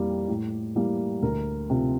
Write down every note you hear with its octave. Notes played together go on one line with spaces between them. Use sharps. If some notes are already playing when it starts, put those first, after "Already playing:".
Already playing: F2 E3 G3 A#3
A2
E3 G3 A#3
D2 A#4
C3 F3